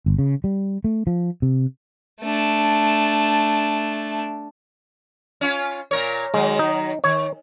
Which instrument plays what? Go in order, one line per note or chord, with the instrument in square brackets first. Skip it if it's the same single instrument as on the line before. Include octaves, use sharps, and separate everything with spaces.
[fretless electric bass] G1
C#3
G3
A3
F3
C3
[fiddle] A3 D4
[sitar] C#4 F4
A#2 A#4 C#5
[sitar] D#3 F#3 [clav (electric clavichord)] G#3
[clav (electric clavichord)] D#4
[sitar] D#3 [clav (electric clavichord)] C#5